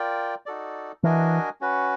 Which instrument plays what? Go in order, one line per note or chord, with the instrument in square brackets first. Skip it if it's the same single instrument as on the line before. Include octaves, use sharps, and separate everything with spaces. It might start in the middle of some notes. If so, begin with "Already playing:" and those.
Already playing: [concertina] F4 A#4 D5 G5
D#4 F#4 A4 D5
[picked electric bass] E3 [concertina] D4 F#4 A#4 D#5 G#5
[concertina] C#4 F#4 B4